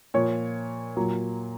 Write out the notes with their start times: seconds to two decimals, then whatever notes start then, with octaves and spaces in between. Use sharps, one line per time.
0.14 A#2 F3 C#5
0.97 A#2 F#3